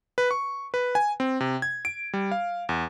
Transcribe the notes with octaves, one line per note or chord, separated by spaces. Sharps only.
B4
C#6
B4
G#5
C4
C3
G#6
D7
G3
F5
E2